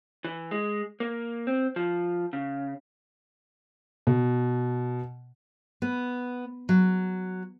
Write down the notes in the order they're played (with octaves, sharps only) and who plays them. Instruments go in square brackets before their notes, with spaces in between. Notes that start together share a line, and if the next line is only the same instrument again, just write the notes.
[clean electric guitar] E3
G#3
A#3
C4
F3
C#3
[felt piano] B2
[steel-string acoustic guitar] B3
F#3